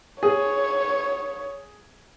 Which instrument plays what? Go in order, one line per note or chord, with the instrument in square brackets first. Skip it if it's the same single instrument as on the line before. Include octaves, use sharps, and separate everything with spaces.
[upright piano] G#4 [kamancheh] C#5